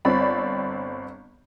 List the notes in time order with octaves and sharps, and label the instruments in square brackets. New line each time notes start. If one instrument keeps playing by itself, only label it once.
[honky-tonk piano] G1 C4 D5 B5